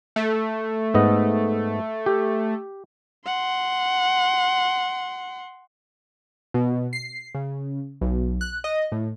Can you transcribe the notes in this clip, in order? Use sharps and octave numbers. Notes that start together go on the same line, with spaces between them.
A3
G#2 B3 D#5
G4
F#5 C6
B2
C7
C#3
B1
F#6
D#5
A2